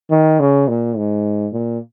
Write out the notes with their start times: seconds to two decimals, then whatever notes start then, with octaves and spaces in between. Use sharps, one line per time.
0.11 D#3
0.40 C#3
0.68 A#2
0.97 G#2
1.53 A#2